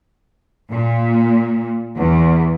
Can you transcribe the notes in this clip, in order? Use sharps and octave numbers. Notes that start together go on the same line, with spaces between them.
A#2
E2